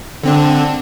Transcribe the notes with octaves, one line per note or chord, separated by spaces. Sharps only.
D3 C4 D4